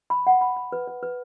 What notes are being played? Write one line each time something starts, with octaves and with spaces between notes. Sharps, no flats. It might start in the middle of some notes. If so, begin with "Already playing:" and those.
B5
F#5
B5
B5
B4
B4
B4